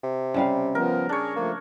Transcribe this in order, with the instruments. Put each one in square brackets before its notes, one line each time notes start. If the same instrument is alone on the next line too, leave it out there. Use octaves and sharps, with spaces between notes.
[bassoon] C3
[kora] C#3 G3 F5
[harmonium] F3 B3 [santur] A#4
[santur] D4 C#5 [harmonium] G#4
[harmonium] F3 A3 [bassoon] A#3